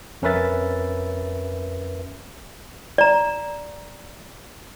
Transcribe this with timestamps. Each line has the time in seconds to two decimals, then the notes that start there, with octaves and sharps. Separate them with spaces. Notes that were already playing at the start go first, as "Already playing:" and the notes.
0.22 F2 C#4 A#4 B4 E5 A6
2.98 D5 A#5